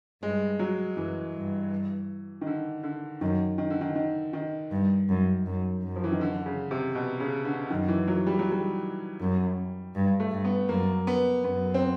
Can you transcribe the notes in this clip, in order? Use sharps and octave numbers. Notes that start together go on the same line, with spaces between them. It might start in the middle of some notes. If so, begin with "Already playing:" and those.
G2 G#3
F#3
F#2 E3
G2
D#3
D3
D3
F#2 D#3
D#3
D3
D#3
D#3
D#3
G2
F#2
F#2
F#2
F3
E3
D#3
D3
C#3
C3
B2
C#3
D3
F#2 D#3
E3
F#3
G3
F#3
G3
F#2
G2
A3
G2
B3
F#2 A#3
B3
F#2 B3
C4